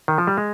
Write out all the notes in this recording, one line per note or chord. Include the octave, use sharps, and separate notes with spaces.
D#3
F3
G3
G#3